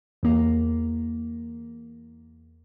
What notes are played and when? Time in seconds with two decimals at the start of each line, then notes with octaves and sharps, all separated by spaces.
0.23 E2 A#3